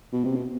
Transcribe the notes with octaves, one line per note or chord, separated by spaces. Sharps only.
B2
C3
B2